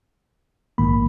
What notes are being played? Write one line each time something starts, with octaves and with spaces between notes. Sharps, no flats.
A#1 G#2 D#3 A#3 B5